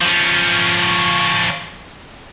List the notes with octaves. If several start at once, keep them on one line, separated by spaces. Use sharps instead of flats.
F3 C#4